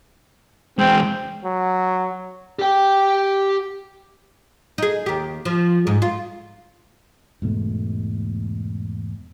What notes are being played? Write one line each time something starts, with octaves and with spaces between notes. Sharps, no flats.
E2 G#3 C4
F#3
G4 G5
D#4 G#4
D#2 G4
F3
G#2
F4
E1 G#2 B2 A3